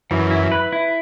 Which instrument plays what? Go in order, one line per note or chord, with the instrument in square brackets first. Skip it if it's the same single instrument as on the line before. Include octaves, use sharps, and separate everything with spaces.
[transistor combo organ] F#2 [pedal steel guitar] E3
[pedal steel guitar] E4
B4
E4